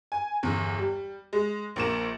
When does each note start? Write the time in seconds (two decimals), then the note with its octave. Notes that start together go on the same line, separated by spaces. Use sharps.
0.12 G#5
0.43 G1 E2
0.79 G3
1.33 G#3
1.76 A#1 A#3 E7